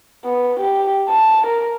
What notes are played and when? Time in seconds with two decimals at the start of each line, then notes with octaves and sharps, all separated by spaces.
0.25 B3
0.60 G4
1.09 A5
1.47 A#4